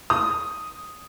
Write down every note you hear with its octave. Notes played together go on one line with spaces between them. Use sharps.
D#6